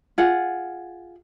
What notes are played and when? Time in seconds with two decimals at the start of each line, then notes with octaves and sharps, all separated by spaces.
0.18 F4 G#4 F#5